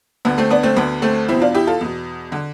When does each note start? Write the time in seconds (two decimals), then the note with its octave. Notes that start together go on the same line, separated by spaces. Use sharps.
0.25 D2 D3 B3
0.38 A3 C4
0.50 B3 D4
0.63 A3 C4
0.77 D2 D3 B3
1.02 A3 C4
1.28 E2 B2 C4 E4
1.41 D4 F4
1.54 E4 G4
1.67 F4 A4
1.81 E2 B2
2.32 D3